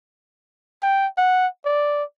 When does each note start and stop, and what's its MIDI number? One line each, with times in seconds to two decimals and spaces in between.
0.83 1.07 79
1.18 1.47 78
1.65 2.03 74